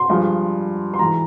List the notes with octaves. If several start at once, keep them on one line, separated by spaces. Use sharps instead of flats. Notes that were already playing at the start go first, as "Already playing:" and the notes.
Already playing: C6
G2 F3 G#3
C6
G#2 E3 G#3 A#5